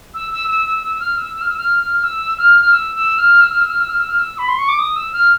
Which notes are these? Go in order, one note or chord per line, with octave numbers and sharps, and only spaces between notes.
E6
E6
E6
E6
E6
F6
E6
E6
F6
E6
F6
F6
F6
E6
F6
F6
E6
E6
F6
E6
F6
E6
F6
E6
F6
E6
F6
E6
B5
C6
C#6
D6
D#6
E6
F6